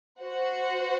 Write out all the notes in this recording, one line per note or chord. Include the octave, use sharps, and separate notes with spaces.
F#4 C5 F#5